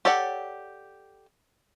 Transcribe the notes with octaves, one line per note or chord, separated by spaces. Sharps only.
G4 A4 C#5 D5 F#5